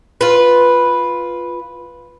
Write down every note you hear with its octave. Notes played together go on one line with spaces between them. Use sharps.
F4 B4